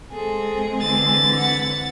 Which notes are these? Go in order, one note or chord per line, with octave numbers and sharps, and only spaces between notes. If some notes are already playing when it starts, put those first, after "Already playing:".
G#3 C4 G#4 A4
D3 E3 A6
F#5 B5